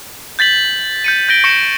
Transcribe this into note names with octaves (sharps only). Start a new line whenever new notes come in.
G6 A6 B6 F#7
G6 C#7 D#7
G6 A#6 D7 G7
C#6 A#6 C#7 E7